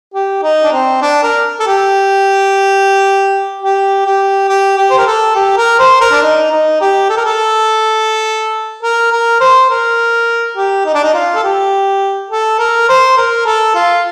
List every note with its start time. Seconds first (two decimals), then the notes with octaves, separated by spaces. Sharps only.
0.14 G4
0.43 D#4
0.64 D4
0.72 C4
1.02 D4
1.23 A#4
1.60 A4
1.67 G4
3.62 G4
4.06 G4
4.49 G4
4.77 G4
4.90 C5
4.98 A#4
5.07 A4
5.35 G4
5.57 A#4
5.79 C5
6.01 A#4
6.12 D4
6.23 D#4
6.51 D#4
6.81 G4
7.10 A4
7.17 A#4
7.25 A4
8.83 A#4
9.12 A#4
9.40 C5
9.70 A#4
10.57 G4
10.86 D#4
10.94 D4
11.04 D#4
11.14 F4
11.35 A4
11.44 G4
12.30 A4
12.59 A#4
12.89 C5
13.17 A#4
13.46 A4
13.75 F4